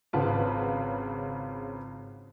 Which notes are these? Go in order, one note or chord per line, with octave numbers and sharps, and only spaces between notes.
G#1 C#3 F4 B4 F#5 A5